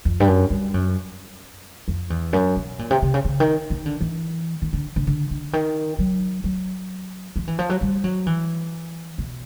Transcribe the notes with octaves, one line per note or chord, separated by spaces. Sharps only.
F2
G2
F#2
G2
F#2
F2
E2
F#2
B2
A#2
C3
C3
C#3
C#3
D#3
D#3
D3
E3
D#3
D3
D3
D3
D3
D#3
F#3
F#3
F3
E3
F3
F#3
G3
F#3
E3
B2